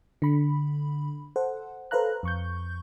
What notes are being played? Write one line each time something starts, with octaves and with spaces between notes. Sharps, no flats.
D3 B5
A4 C5 F#5
A4 B4 C5 F5 A#5 F#6
F2 C#6 G6